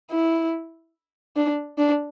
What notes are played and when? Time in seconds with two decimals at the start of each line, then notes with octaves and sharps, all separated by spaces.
0.10 E4
1.36 D4
1.78 D4